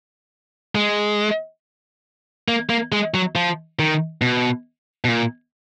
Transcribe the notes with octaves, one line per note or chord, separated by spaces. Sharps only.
G#3
A#3
A#3
G#3
F#3
F3
D#3
B2
B2
A#2